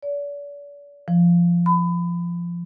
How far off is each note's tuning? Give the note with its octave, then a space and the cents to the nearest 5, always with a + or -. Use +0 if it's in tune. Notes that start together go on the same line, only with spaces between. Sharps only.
D5 -40
F3 -15
B5 +25